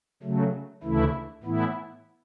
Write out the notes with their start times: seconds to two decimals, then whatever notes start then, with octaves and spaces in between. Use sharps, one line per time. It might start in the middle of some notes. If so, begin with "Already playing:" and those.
0.23 C#3 F#3 A3
0.83 D2 C#3 E3 A3 E4
1.43 A2 E3 B3 E4